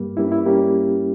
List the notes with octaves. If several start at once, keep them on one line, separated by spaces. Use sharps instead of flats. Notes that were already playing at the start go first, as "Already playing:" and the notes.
Already playing: G2 G3 A#3
G2 G3 A#3 C#4 E4
E4
G3 A#3 C#4 G4